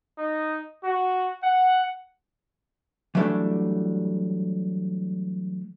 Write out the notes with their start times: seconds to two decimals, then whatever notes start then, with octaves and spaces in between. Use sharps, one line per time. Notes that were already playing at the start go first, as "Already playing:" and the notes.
0.18 D#4
0.83 F#4
1.43 F#5
3.15 E3 F#3 G3 A3 D4